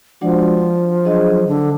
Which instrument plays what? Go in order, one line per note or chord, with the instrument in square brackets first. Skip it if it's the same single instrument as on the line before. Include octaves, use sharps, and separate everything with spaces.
[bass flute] F3 [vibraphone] G#3 D4 F#4 D5 F#5
[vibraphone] F#3 D4 G#4 D#5
[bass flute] D3